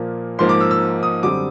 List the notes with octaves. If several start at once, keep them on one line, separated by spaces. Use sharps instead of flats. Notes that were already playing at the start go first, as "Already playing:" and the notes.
Already playing: A#2 F3 A#3
G#2 F3 A#3 C6
D6
E6
E6
D#6
F#2 D3 G3 C4 D6